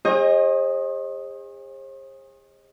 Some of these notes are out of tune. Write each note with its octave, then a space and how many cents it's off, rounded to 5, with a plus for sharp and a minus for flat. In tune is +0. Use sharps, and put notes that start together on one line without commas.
G#4 -40 C5 +45 D#5 +0